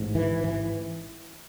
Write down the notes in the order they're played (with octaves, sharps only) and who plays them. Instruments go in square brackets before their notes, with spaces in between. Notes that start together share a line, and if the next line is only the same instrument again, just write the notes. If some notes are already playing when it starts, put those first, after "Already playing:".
Already playing: [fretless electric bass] A1 G#2
E3
E3